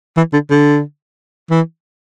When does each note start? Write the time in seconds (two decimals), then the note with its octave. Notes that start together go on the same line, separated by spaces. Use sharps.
0.17 E3
0.33 D3
0.50 D3
1.51 E3